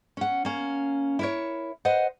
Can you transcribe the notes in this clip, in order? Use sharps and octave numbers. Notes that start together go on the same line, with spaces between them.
C#4 F#5
A#3 C#4
E4 A#4 C#5
B4 C5 D#5 F#5